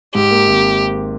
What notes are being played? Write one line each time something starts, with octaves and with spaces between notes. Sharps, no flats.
G#2 G4
A#3
G#1